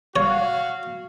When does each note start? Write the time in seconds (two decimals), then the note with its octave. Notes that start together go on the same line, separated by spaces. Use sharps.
0.16 F#4 C#5 F5